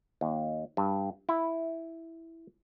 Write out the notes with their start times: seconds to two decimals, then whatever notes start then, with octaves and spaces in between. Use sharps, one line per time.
0.21 D#2
0.77 G2
1.29 E4